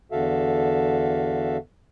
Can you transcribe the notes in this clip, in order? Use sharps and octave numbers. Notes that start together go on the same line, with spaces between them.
E2 D3 F#4 A4 E5 F5